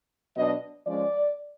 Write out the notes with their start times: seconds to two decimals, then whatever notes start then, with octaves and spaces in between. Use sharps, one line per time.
0.36 B2 F#3 B3 D4 D#5
0.86 F3 G#3 C#4 D5